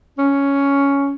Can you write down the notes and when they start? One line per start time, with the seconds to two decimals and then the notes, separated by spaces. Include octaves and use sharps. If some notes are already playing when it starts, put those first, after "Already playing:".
0.18 C#4